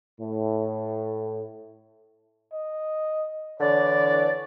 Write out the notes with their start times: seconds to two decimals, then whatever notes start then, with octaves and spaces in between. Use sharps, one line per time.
0.20 A2
2.53 D#5
3.60 D3 E3 C#5 D5